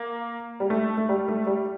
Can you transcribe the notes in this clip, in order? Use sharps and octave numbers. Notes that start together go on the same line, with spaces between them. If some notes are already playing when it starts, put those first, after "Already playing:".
Already playing: A#3
G3
A3
A3
G3
A3
G3